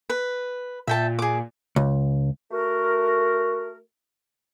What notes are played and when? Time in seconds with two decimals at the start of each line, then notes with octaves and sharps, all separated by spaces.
0.10 B4
0.87 A#2 E5 G5 A5
1.19 G#4 D6
1.76 C#2
2.52 A3 F#4 A#4